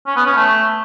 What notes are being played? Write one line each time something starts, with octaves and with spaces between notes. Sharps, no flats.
C#4
B3
C#4
A3